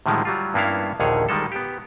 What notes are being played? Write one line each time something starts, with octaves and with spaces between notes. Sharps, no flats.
A2 D3 D#3 F3 G3 G#3
F#3 G3 F4
G2 A#3 B3 C#4 E4 F5
A#1 D#2 D3 D#3 G#4 C#5
D#3 G3 G#3 A4
B3 G4